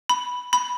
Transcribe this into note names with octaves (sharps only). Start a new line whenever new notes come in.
B5
B5